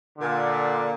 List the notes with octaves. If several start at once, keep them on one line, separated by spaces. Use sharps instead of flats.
A#2 D3